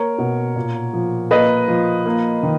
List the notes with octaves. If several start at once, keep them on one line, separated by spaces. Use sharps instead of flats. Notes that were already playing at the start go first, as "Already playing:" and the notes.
Already playing: A#3 A#4 C#5
B2
A#2
F3
A#3 B4 D#5
F3
A#3
D#3